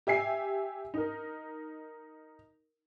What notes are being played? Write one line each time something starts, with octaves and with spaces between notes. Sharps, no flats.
G4 E5 G#5 C7
D#4 A#4